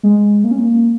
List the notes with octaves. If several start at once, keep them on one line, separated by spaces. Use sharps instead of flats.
G#3
A#3
C#4
A#3